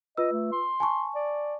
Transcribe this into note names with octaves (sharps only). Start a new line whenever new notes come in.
F4 B4 D#5 E6
A3
C6
G#5 A5 C#6
D5